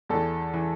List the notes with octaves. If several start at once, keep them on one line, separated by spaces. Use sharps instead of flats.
E2 E3 A4
E3